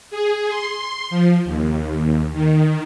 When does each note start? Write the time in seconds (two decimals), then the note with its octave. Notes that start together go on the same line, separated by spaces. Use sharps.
0.11 G#4
0.50 C6
1.10 F3
1.45 D#2
2.33 D#3